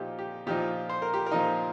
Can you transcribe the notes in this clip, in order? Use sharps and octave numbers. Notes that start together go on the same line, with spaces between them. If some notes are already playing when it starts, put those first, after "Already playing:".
Already playing: A#2 F3 D#4 G4
G4
A#2 F3 D#4 G4
C5
A#4
G4
A#4
A#2 F3 D#4